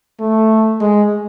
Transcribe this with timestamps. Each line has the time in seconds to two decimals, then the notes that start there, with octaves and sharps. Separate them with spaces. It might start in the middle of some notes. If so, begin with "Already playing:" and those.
0.20 A3
0.81 G#3